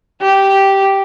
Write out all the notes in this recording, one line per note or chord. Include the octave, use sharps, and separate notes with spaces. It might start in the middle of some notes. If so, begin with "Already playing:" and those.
G4